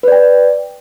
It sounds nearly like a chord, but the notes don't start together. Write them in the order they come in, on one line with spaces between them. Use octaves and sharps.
B4 D5 G5